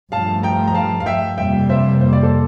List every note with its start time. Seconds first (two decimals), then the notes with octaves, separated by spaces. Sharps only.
0.12 G2 F3 A3 F5 A5
0.43 G5 A#5
0.68 A#5
0.74 F5 A5
1.00 F5
1.06 E5 G5
1.38 F2 C3 G3 A#3 E5 G5
1.69 C5 E5
2.01 C5
2.13 D5
2.23 A4 C5